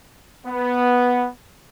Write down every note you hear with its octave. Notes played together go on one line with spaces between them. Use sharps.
B3